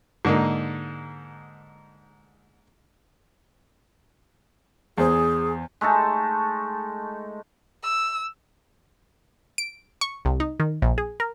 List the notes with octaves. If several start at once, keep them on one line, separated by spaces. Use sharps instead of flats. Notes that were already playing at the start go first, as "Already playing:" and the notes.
G#2 D3 A#3 D#4
E2 G#4 C5
G#3 A3 D#4 A4
E6
D7
C#6
C2
D#4
D#3
A#1
G#4
A#4